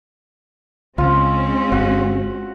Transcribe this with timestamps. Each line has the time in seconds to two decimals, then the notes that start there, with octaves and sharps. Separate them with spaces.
0.98 C#2 G#3 C4 C#4 F4
1.72 G1 F#4